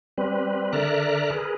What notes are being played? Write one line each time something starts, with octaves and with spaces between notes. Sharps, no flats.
G3 C4 B4
D3 A#4 D5 E5 A#5 F#6
G#4 A#4 B4